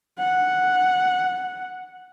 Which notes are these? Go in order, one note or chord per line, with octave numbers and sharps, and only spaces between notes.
F#5